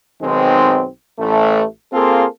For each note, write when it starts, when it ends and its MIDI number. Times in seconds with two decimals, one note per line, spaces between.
0.21 0.86 35
0.21 0.86 51
0.21 0.86 56
0.21 0.86 60
1.19 1.64 33
1.19 1.64 57
1.93 2.25 58
1.93 2.25 60
1.93 2.25 65
1.93 2.25 68
1.93 2.25 69